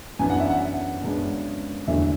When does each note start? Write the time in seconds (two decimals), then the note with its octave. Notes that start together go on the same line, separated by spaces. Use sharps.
0.19 F#2 E3 B3 D4 G#5
0.30 F#5
0.40 E5
0.50 F#5
1.03 F#2 C#3 G#3 B3 D4
1.88 E2 D3 F#3 A3 D4 E5